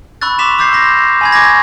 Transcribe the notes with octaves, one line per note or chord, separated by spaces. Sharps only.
B5 C#6 E6 F#6 A6
C6 D6 B6 E7 F7
D6 E6 G6 A6 C7
C6 D6 A#6
G#5 B5 G#6
C#6 D6 G#6 A#6